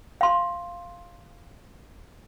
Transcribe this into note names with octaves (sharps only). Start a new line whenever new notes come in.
F5 C6